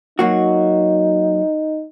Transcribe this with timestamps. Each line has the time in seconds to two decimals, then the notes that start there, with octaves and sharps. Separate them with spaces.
0.19 F#3 A#3 D#4 F#4